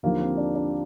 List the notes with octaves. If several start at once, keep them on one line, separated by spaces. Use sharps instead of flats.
D#2 D3 F3 A#3
C4
D4
D4